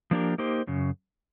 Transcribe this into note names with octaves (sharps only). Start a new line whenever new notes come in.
F3 A#3 D4 G4 A#4
A#3 D#4 G4 C5
F#2 C#3